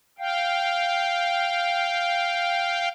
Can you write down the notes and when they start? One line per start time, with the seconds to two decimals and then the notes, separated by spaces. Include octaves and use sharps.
0.19 F5 G5